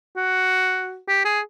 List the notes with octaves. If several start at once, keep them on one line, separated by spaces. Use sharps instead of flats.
F#4
G4
G#4